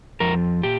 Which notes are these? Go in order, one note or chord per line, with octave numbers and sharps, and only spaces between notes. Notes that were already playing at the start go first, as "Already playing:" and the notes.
F2 F3 A#4
A#2 G4